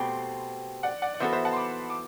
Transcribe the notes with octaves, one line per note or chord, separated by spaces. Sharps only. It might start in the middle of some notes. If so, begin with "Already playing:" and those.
Already playing: B2 A3 C4 G4 A5 B5 C6
D5 F#5
D5 F#5
D5
E3 B3 F#4 A4 C5 E5
C5 E5
F#5 A5
C6
B5 D6
D6